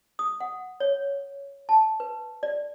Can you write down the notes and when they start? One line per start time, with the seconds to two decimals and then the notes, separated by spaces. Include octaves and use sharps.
0.19 D#6
0.40 F#5
0.80 C#5
1.69 A5
2.00 B4
2.43 D5